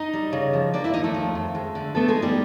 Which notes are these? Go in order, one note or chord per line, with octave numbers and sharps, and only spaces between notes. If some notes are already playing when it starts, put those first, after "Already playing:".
Already playing: D#4 D#5
G3
C#3
F3
A#3 D4 D5
E4 E5
D#2 D#4 D#5
A3 A4
F3
F2
G#3
D3
A3 B3 A4
G#3 G#4
D#4
G3 G4